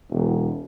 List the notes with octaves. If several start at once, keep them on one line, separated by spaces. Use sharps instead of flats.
E1